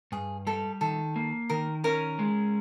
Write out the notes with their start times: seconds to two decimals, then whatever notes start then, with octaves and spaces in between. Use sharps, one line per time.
0.12 G2 G#4
0.47 G3 A4
0.81 D#3 A4
1.16 A#3
1.50 D#3 A#4
1.84 C#4 A#4
2.19 G#3